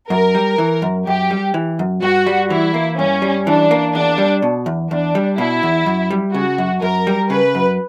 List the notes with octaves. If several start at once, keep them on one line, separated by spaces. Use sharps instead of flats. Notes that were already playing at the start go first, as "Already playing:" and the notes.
F#2 A#4
G3
E3
F#2
F#2 G4
G3
E3
F#2
G2 F#4
G3
E3 E4
A#3
G2 C#4
G3
E3 D4
A#3
E2 D4
G3
B2
E2
E2 D4
G3
B2 E4
E2
F#2
G3
C#3 F#4
F#2
F#2 A#4
G3
C#3 B4
F#2